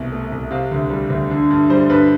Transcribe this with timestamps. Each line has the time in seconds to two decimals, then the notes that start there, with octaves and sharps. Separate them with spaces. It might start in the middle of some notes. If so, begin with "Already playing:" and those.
Already playing: C2 B2
0.12 A3
0.32 C2
0.51 C3 F5
0.71 D2
0.90 G3
1.10 D2
1.31 D3
1.50 G2
1.70 G3 C5
1.89 G2 B4